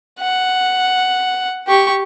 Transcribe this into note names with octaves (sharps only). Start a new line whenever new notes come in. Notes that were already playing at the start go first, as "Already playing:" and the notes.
F#5
G4 C#6